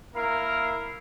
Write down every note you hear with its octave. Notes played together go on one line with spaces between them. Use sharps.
A#3 E4 A#4 F5